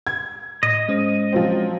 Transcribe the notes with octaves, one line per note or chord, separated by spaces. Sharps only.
G#6
A2 D#5
G#3 C#4 C5
F3 F#3 C4